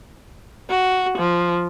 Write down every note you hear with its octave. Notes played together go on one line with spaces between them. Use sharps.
F#4
F3